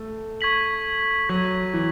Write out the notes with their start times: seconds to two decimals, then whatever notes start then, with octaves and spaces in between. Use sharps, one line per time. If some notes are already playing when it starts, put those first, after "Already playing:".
Already playing: A3
0.41 C#6 G#6 B6 F#7
1.29 F#3 C#6 G#6 B6 F#7
1.74 E3